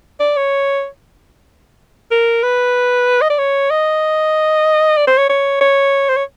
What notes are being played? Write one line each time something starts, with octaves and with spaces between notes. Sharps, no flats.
D5
C#5
A#4
B4
D#5
D5
C#5
D#5
D5
C5
C#5
C#5
C#5
C5
C#5